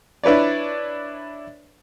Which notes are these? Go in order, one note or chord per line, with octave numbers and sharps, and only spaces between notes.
D4 E4 B4 C#5 D5